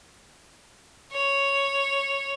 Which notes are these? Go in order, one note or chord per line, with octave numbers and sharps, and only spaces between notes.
C#5